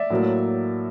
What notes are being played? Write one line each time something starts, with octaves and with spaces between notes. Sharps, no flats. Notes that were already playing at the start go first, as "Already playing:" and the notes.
Already playing: D5 E5
A2 F#3 A#3